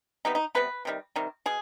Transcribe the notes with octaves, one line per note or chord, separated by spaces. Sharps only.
C3 G3 B3 D#4
D#4
C3 G3 B3 B4
C3 D#3 G3
C3 D#3 G3
B2 G#4